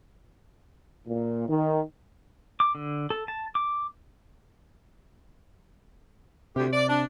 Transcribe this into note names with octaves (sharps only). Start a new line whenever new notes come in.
A#2
D#3
D6
D3
A4
A5
D6
D2 C3 G4
D5
D4